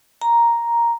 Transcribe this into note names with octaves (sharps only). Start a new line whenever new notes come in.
A#5